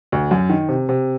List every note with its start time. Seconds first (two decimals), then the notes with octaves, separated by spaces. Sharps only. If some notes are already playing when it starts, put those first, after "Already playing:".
0.12 D2
0.31 F#2
0.50 D#3
0.69 C3
0.89 C3